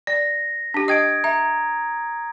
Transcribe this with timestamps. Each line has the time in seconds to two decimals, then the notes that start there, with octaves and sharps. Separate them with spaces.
0.07 D5 A#6
0.74 D4 G4
0.88 D#5 G5 D#6 G#6 D7
1.24 E5 A#5